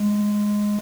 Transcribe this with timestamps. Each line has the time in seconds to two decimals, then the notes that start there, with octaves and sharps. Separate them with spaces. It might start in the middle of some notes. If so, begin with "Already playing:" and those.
Already playing: G#3